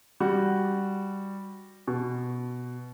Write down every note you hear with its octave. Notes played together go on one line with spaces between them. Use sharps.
G3 F#4
B2